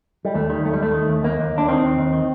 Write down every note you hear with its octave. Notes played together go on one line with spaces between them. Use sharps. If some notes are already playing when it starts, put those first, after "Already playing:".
G3
D#2 A3
D#3 G3
D#2 A3
G3
D#2 A3
D#3
D#2
D#2 A#3
D#2
D#2 D4
D#3 C4
D#2
D#2
D#3